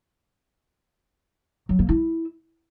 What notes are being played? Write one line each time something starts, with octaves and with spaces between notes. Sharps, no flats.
F#3
A#3
E4